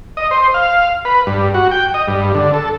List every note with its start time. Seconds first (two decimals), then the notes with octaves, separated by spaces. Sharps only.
0.17 D#5
0.31 C5
0.54 F5
1.05 B4
1.27 G2
1.54 F#4
1.71 G5
1.94 D#5
2.07 G2
2.35 D3
2.54 A4